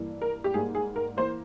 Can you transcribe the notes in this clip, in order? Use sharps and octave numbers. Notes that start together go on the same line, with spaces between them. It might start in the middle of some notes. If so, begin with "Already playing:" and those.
Already playing: G2 E3 A#3
A#4
G4
G#2 G3 A#3 G#4
G#4
A#4
E3 A#3 C5